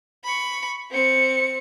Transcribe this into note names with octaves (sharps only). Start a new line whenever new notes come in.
B5 C#6
C4 C#7